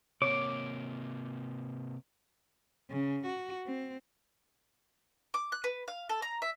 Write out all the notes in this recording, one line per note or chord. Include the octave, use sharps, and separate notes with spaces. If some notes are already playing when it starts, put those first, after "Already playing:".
C3 A#3 C#5 D6
C#3
F#4
C4
D6
F#6
B4
F5
A4
A#5
E5